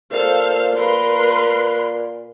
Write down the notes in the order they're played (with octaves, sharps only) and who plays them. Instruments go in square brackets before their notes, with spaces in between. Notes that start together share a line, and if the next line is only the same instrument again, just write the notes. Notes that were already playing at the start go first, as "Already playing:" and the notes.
[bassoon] A#2 [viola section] A4 C5 F5
[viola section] A#4 B4 C6